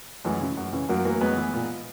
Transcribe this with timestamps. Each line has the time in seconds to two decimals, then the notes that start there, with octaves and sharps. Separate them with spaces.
0.25 F#2 E3 G#3
0.41 C#3 E3
0.57 F#2
0.73 C#3 E3
0.89 F#2 F#3 A#3
1.05 E3 F#3 A#3
1.21 F#2 G#3 B3
1.37 E3
1.54 A#2